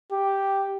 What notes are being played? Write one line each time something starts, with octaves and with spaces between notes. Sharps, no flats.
G4